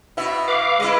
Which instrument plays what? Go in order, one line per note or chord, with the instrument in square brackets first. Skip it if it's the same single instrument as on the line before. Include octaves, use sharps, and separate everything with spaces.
[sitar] B2 E4 E5
[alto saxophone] B4 [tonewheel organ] F5 D6
[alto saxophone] G#3 [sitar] E4 B4 D#5